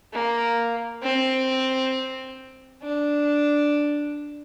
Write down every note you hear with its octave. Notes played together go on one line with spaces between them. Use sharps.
A#3
C4
D4